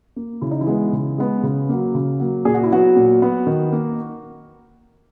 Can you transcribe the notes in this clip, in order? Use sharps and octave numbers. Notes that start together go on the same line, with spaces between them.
A#3
C#3 E4
D#4
E3 E4
G#3 B3
C#3
G#3 B3
C#3
F#3 A#3
C#3
F#3 A#3
A#2 G#4
F#4
E4
F#3 B3 F#4
A#2
F#3 B3
D#3
A#3